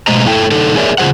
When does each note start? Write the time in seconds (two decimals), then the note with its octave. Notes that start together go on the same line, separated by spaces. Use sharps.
0.07 B2 G#3 A3 C5 D#5 A#5
0.26 A3 E4 A4 G5
0.51 D3 A3 D#4 A4
0.76 G#4 A#4 C#5 D5 E5
0.98 C#3 F4 G#4 C5 F#5